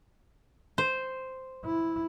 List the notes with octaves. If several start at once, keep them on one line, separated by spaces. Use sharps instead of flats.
C5
E4